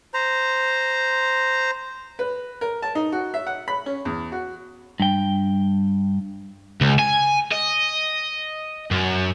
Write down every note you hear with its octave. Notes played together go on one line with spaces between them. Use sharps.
C5 A#5
B4
A#4
A5
D#4
F#4
E5
F#5
B5
C#4
E2
F#4
G2 G5
C#2
G#5
D#5
F#2